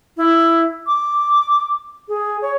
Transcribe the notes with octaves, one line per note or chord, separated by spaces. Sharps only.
E4
D6
G#4
C#5